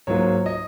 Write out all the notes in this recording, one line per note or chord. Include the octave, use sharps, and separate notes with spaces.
G#2 F#3 A#3 F4 C#5
D#5